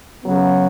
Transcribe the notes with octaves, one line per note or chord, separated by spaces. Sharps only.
C#3 F#3 B3